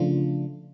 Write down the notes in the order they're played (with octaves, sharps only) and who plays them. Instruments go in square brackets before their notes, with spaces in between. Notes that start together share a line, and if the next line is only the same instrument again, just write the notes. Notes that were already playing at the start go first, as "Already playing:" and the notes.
Already playing: [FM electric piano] C#3 F3 A3 D4 F4